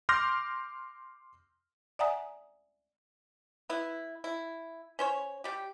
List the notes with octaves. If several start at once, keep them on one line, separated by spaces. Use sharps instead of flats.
C6 D6 F6 G6 A#6
D5 E5 F#5 G#5 A#5 D#6
B3 E4
E4
C#4 C5 C#5
G3 G4